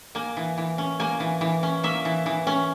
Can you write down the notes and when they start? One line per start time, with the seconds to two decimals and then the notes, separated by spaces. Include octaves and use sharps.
0.15 A#3 G#5
0.37 E3
0.58 E3
0.78 C#4
1.00 A#3 G#5
1.20 E3
1.41 E3
1.63 C#4
1.83 A#3 E5
2.05 E3
2.26 E3
2.47 C#4